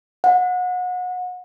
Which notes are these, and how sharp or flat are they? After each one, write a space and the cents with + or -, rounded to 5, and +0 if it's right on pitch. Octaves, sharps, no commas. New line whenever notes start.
F#5 -30